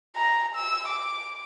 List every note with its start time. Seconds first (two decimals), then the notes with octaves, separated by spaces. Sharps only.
0.16 A#5
0.55 E6
0.88 D6